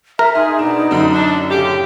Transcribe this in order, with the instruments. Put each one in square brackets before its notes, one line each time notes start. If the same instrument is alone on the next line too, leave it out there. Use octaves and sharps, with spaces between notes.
[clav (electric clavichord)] A#4 [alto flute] E5
[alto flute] D#4 [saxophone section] G#4 [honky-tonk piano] C6
[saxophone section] B2 B3 D4 [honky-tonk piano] E7
[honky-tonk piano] F#2 D3
[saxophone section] D4
A2 C#3 G4